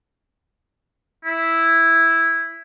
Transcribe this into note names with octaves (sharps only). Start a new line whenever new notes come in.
E4